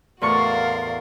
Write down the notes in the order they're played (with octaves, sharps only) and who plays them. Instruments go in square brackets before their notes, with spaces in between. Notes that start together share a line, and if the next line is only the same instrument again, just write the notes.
[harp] E2 A2 C#6 [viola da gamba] F#4 A#4 [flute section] D5 F5 C6